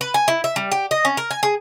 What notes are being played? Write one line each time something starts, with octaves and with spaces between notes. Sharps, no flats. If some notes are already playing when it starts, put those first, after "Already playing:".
B4
G#5
E4
E5
G3
G4
D#5
C#4
A#4
G#5
G#4